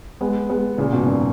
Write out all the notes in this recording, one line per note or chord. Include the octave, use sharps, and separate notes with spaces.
G#3 B3
G#3 B3
A#2 C#3
G#2 B2
F#2 A#2